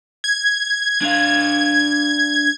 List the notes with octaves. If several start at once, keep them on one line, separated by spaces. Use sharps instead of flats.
G#6
D4 F5